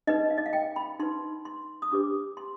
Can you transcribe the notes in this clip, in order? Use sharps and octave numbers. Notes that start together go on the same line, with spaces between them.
D#4 B4 D#5
F5
D#5
F5
G5
B5
D#4 B4 C6
C6
D#6
D4 G4 B4 D6
C6